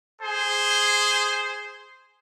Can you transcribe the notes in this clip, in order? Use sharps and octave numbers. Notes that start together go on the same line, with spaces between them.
G#4 C5